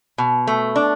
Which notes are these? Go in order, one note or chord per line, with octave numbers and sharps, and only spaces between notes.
B2
A3
D4